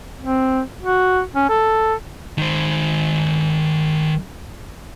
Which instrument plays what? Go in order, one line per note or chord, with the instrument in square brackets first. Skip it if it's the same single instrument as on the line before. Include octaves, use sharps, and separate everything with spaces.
[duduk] C4
F#4
C#4
A4
[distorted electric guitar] D#3 C5